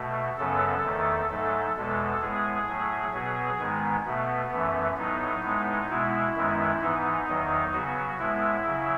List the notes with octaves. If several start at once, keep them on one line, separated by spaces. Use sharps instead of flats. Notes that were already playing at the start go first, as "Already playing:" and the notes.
Already playing: B2 A3
F#2 C#3 F#3 B3 A4
E2 D#3 A3
G#2 F#3 A3 A4
E2 B2 G#3 B3 A4
A2 G#3 B3 G#4
A2 F#3 A3
B2 F#3 B3 G#4
G#2 D#3 G#3 B3
B2 A3 B3
F#2 E3 A3
A2 F#3 B3 D#4
A2 G#3 B3
B2 G#3 B3 E4
F#2 D#3 G#3 B3
G#2 E3 B3 D#4
E2 D#3 F#3
C#3 F#3 B3 F#4
A2 G#3 B3 E4
C#3 F#3